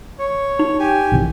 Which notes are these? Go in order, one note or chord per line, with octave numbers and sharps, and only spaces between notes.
C#5
D#4
G4 G#5
A#1 C3 E3